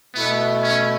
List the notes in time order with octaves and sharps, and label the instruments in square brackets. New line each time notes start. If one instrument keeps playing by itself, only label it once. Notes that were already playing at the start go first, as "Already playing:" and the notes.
[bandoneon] B2 A3 E4 [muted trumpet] B3
[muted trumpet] C#4